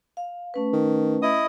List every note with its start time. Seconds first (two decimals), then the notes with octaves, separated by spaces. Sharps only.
0.17 F5
0.54 A3 C#4 B4
0.73 D#3
1.22 E4 D#5 D#6